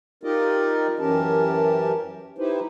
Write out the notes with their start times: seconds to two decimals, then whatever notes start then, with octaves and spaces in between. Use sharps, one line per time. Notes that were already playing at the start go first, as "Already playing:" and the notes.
0.24 D#4 F4 G4 A#4 D5 D#5
0.99 F#2 E3 C#4 G4 A#4 A5
2.38 D#4 E4 G4 B4 C5